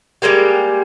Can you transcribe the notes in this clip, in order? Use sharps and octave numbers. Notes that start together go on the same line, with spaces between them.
G3 G#3 A#3 G4